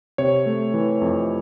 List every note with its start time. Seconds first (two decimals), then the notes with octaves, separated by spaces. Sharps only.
0.18 C3 C#5
0.46 A3
0.74 E3
1.02 F2